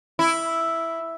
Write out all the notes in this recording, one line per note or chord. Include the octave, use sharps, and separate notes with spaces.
E4